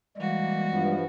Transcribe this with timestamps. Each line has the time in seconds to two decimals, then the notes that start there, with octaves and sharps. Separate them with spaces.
0.17 E3 G3 G#3 A#3 F#4
0.68 G2 F3 B3